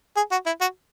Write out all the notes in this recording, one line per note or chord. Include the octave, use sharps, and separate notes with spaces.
G#4
F#4
E4
F#4